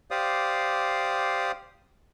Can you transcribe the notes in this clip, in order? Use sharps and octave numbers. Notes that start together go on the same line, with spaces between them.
G4 C5 D5 F5 D#6